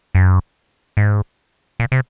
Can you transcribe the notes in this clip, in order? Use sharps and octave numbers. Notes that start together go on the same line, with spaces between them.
F#2
G#2
A#2
C3